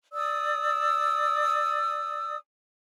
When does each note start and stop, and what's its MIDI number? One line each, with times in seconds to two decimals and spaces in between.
0.12 2.37 74
0.12 2.37 87
0.12 2.37 88